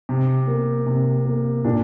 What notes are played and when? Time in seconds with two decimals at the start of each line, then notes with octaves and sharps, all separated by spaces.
0.09 C3
0.47 A#3
0.86 C3
1.26 A#3
1.65 A#2 D4